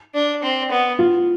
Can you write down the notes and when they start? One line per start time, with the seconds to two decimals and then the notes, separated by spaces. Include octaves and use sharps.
0.14 D4
0.43 C4
0.71 B3
0.99 F4